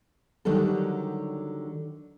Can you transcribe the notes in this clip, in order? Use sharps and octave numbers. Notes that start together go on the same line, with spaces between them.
D3 D#3 F#3 G3 A4